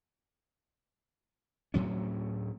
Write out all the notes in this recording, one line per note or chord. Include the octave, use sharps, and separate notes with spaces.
D2 A2 F#3 C#4